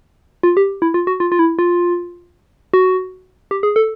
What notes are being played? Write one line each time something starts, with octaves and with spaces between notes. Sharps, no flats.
F4
G4
E4
F4
F#4
F4
F4
E4
F4
F#4
G4
G#4
A4